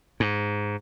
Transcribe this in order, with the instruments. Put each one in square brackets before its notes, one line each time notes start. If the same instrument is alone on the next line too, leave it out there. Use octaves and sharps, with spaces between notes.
[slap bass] G#2